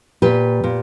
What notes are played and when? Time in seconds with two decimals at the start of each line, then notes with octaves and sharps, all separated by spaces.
0.22 A#2 G4 B4
0.64 A#2